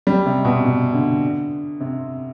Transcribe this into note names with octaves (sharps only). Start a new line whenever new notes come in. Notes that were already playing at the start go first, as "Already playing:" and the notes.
G3
C3
B2
C3
D3
C3